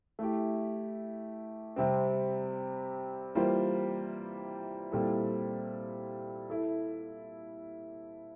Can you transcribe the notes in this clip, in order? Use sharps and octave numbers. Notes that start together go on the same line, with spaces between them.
A3 E4 G4
C3 G3 C4
E3 G3 A#3 F4 C5
A#2 G3 C4 E4 A4
E4 A4